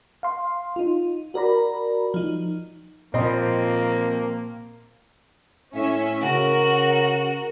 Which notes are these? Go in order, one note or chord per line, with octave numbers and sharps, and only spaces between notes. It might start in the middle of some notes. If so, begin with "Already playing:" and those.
F5 C6
D#4 F4
F#4 A#4 D5 A#5 B5
F3 D#4
A#2 F3 A#3 C4 D#5 B5
A2 C#4 E5
C#3 F#4 A#4